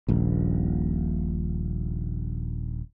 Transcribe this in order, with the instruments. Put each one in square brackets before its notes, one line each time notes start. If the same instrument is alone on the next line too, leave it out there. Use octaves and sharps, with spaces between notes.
[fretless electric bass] D#1 A#1